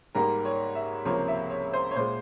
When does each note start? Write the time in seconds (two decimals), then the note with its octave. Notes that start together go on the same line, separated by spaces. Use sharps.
0.15 G#2 G3 A#3 A#4
0.45 C#5
0.75 E5
1.05 C#2 C3 F3 A#3 C#5
1.28 E5
1.50 C#5
1.74 C5
1.91 C#5
1.96 A#2 G#3 C5